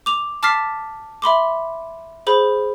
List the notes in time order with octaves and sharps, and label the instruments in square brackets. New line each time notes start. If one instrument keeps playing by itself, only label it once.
[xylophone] D6 F7
A5 D6 F6 A6 B6 C7
E5 B5 C6 D6
G#4 C5 B5